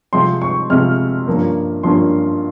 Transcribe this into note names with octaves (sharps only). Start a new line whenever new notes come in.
C3 F3 G#3 C4 C6
C#6
C3 F3 G#3 C4 F6
G2 F3 A#3 C#4
G2 F3 A#3 C#4 C6